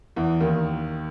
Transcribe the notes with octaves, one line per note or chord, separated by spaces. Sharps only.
E2 E3
D#2 D#3